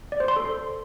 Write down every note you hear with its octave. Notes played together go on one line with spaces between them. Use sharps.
D5
C5
C6
A4